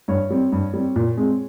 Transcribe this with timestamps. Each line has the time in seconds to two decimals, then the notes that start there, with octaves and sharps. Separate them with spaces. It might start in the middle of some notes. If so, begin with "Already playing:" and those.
0.08 G2 C#5
0.30 G3 C4
0.52 G2
0.73 G3 C4
0.96 A#2
1.17 G#3 C4